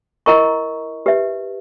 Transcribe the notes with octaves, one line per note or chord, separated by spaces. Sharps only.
E4 A#4 D#5 A#5 C#6
G4 B4 E5